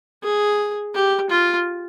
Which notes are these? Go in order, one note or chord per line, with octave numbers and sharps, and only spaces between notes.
G#4
G4
F4